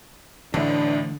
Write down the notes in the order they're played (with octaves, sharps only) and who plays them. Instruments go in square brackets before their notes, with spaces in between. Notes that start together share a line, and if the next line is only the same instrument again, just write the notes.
[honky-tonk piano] A1 A2 E4 [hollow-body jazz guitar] D3 [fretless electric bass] E3 A3 [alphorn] D4